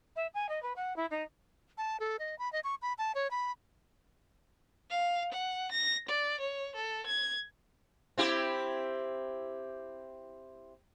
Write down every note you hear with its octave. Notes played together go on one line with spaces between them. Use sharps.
E5
G#5
D#5
B4
F#5
E4
D#4
A5
A4
D#5
B5
D#5
C#6
B5
A5
C#5
B5
F5
F#5
A#6
D5
C#5
A4
G#6
C4 E4 G4